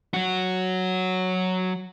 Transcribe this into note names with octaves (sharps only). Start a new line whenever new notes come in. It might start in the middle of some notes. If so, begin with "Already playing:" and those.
F#3 F#4